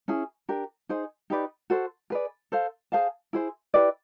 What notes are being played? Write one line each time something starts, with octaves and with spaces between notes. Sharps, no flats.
C#4 E4 G#4
D4 G4 A#4
D#4 G#4 C5
D#4 G4 B4 D5
F#4 A4 C5
G#4 B4 D5
A4 C5 F5
G#4 C5 F5 A5
E4 G#4 C5
E4 G4 B4 D5